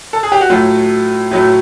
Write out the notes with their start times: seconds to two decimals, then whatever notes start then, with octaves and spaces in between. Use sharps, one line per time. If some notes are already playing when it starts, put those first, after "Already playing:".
0.13 A4
0.23 G#4
0.32 G4
0.41 F#4
0.50 A2 F#3 A3 F4
1.31 A2 F#3 A3